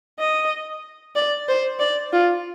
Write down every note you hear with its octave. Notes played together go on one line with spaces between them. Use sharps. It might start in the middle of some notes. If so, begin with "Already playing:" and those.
D#5
D5
C5
D5
F4